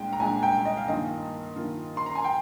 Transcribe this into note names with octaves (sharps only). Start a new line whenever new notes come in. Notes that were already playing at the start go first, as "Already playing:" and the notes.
Already playing: C2 A#2 G#3 D4 G5
A#5
C2 A#2 G#3 D4 G#5
G5
D#5
F5
G2 D#3 A#3 F4 D#5
G2 D#3 A#3 F4
C6
A#5
G#5
G5